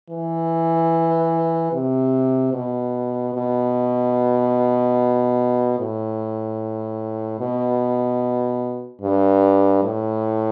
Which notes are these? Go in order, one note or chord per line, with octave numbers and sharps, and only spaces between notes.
E3
C3
B2
B2
A2
B2
G2
A2